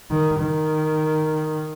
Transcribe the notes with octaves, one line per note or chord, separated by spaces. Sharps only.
D#3
D#3